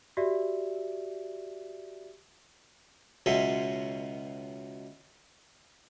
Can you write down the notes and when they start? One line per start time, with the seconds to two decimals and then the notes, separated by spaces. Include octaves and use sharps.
0.17 F#4 G4 D5 E5
3.26 C#2 B2 F#3 C#4 E5 C6